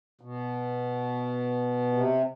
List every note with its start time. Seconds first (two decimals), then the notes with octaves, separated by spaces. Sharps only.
0.21 B2
1.92 C3